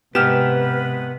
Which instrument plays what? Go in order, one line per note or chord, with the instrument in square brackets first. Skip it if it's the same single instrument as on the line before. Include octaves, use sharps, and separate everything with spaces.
[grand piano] G#2 F6 E7 [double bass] C3 [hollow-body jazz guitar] B3 G4 [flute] B4